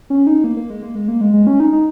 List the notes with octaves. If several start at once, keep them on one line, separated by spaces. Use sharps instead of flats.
C#4
D#4
A#3
A#3
G#3
A#3
G#3
A#3
G#3
G#3
C#4
D#4
D#4